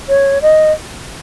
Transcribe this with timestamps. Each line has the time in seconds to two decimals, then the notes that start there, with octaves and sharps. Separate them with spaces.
0.09 C#5
0.42 D#5